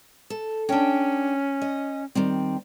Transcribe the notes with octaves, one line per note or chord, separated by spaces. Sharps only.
A4
C#4 D4 G5
D#5
D#3 G3 C4